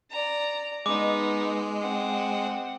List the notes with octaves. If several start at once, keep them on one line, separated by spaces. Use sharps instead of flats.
D5 A#5
G#3 B3 D#4 D6
C4 F#5